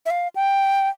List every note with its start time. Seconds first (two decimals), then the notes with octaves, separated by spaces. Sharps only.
0.06 E5
0.10 F5
0.36 G5